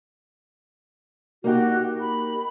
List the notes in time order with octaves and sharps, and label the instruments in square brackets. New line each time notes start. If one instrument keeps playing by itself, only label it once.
[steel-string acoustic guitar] A#3 D#4 G4 [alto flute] F#4
[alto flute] B5